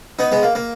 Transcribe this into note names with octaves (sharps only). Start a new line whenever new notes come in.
B3 D#4
G#3 B3
A#3
A#3